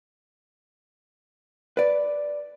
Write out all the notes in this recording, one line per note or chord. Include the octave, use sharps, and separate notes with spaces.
B4 D5